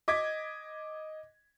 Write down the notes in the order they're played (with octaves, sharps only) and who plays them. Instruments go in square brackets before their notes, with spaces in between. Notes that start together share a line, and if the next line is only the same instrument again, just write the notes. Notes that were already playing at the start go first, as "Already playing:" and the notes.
[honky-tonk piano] D#5 D6 G#6 B6